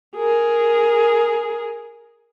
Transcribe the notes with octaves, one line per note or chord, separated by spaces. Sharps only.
G#4 A#4